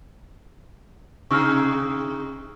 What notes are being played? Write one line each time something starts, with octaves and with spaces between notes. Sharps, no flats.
C3 D#4 G#4 C#6 E6 F6